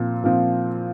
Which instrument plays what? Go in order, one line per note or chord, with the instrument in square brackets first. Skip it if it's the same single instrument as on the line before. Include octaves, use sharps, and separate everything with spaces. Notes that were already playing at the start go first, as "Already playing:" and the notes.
Already playing: [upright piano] A#2 F3 C4
A#2 F3 C4